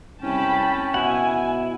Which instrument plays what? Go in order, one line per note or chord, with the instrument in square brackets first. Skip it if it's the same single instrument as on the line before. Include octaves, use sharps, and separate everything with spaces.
[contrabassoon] C2 [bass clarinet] C#4 [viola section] G5 A5 B5
[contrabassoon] B2 [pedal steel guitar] E4 F#5 [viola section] G#5